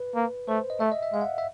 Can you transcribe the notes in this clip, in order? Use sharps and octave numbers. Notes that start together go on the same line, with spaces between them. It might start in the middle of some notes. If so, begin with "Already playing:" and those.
Already playing: B4
A#3
A3 C5
D#5
A3 E5
D#5
E5
G#3 F5
F#5
E5